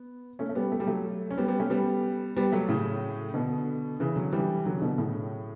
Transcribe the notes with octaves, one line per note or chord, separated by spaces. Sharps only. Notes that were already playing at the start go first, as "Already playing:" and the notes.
Already playing: B3
A3 C#4
A3
G3 B3
A3
G3
F#3 A3
C#4
G3 B3
G3 B3
A3 C#4
G3 B3
G3 B3
F#3 A3
A2 C#3
B2 D3
C#3 E3
D3 F#3
E3 G3
D3 F#3
C#3
B2 D3
A2 C#3